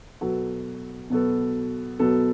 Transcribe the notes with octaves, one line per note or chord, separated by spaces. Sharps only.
B2 F#3 B3 F#4 A4
B2 F#3 B3 F#4 A4
B2 F#3 B3 F#4 A4